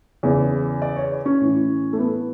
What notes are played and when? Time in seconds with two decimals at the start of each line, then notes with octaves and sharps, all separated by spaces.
0.23 E2 C#3 E3
0.82 D5
0.96 C#5
1.26 C#4
1.40 A2 E3
1.93 A3
1.99 B3